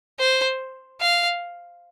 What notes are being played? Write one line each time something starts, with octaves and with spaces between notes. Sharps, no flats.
C5
F5